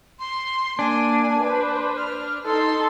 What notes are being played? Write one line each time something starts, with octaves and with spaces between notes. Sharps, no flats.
C6
A#3 D4 G#5
B4 C5
F6
D#4 A4 C6